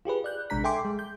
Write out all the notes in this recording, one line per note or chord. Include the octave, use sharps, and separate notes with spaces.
F4 G4 G#4 B4
D5 F#6 G6
A#1 C3 G#3 D4 A#5 B6
A4 E5 G5 G#5 C6 D6
G#3
G6